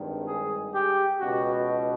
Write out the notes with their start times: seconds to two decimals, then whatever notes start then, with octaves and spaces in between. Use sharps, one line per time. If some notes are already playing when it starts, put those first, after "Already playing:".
Already playing: G#1 G2 D#3
0.27 G#4
0.73 G4
1.20 C#2 B2 F#4